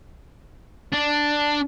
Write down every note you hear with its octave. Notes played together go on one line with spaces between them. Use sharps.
D4